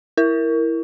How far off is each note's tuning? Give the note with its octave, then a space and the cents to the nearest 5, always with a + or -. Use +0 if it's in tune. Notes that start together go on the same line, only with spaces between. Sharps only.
E4 +0 A#4 +0